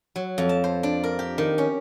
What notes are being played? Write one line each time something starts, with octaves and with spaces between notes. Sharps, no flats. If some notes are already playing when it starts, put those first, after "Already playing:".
F#3
F2
A5
C5
D4
A#4
G4
D#3
C#4